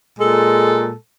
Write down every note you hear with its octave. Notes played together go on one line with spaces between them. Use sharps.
A#2 G#3 A4